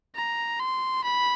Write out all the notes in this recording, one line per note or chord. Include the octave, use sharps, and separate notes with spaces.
A#5
C6
B5